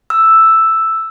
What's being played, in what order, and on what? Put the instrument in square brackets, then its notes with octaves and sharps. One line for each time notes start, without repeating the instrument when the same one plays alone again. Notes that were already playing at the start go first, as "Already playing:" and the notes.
[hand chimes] E6